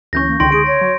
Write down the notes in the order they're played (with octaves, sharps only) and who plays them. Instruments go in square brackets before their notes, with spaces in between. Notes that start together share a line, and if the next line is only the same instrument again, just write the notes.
[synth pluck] D2 E3 C#4 [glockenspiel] C#6 G6 A#6
[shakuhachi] A#3
[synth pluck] C#2 D3 D#4 [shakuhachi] G5 [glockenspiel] C6 A#6 D7
[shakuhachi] G#4 [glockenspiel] D7
[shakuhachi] C#5 [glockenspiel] A#6
[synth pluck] F#3